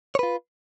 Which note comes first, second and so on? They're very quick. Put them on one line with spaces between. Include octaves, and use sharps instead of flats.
C#5 B4 F4